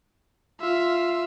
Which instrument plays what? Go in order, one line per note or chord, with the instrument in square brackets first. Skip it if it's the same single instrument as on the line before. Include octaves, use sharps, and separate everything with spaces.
[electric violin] F4 E5